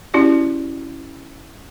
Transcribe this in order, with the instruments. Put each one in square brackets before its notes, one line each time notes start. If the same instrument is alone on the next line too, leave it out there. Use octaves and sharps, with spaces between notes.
[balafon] C#4 E4 F#4 G4 D5